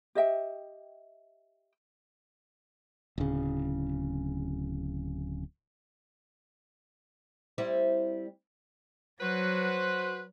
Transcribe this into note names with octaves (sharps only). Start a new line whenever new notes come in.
G4 D#5 E5 G5
D1 C#3
G3 C4 E4
F#3 F#4 B4 C5